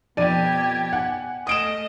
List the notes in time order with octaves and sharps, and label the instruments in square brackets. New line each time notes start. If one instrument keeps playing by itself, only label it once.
[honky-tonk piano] F2 D#7 [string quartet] B2 G4 G#6 [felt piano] D5
[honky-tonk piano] F#5 G#5
[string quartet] A3 D#5 [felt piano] D#6 D7 E7